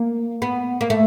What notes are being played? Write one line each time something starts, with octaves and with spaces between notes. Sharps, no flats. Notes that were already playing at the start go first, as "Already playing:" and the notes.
Already playing: A#3
B3
A#3
A3